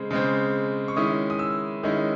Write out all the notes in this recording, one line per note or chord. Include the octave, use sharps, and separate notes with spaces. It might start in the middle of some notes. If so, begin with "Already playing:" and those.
Already playing: C#3 G#3 C4
C#3 G#3 C4
C#6
D#3 G#3 C#4 E4 D#6
D#6
E6
D#3 G#3 C#4 E4